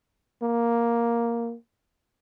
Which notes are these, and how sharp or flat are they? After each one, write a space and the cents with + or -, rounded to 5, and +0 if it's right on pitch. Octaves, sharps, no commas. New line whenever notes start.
A#3 +5